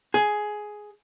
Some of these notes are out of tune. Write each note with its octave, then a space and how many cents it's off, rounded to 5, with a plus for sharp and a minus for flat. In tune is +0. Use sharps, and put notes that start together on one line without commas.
G#4 +10